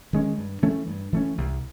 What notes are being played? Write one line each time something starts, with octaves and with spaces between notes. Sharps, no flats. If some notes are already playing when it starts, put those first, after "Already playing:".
D#3 G#3 C#4
G2
E3 A3 C#4
G2
E3 A3 C#4
C2